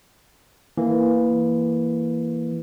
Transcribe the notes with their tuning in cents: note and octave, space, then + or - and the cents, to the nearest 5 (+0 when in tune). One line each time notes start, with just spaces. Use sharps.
E3 +0 A#3 +0